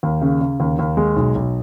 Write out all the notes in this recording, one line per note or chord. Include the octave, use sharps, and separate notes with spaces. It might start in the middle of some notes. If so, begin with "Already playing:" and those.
D#2
C#3
C#3
D#2
D#2
G#3
B1
B1